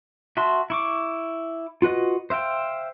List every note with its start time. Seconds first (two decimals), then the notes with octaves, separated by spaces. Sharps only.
0.37 F#4 E5 A5 C6
0.70 E4 C#6 D6
1.82 F4 F#4 B4 D#5
2.30 C5 E5 F5 G5